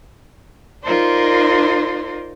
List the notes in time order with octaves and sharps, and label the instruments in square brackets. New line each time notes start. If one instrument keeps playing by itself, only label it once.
[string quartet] D#4 F4 A#4 C5 D5 C6